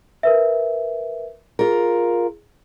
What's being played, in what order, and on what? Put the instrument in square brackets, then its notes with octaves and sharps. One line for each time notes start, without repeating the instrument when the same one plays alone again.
[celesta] A#4 B4 E5
[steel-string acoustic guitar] F4 A#4 [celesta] G#4